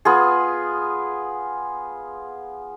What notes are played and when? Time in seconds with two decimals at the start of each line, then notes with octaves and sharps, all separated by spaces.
0.05 B3 F4 G#4